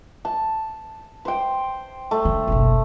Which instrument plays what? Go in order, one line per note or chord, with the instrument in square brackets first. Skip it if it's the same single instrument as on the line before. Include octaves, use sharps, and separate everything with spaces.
[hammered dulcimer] A5
C5 G5
A3
[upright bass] D3
F#1 B1